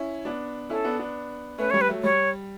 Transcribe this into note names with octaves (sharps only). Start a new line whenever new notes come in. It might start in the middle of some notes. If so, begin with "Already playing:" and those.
Already playing: C#4 E4
B3 D4
C#4 E4 A4
B3 D4
B3 D4
A3 C#4 B4
G3 C#5
B4
F#3 A3
G3 C#5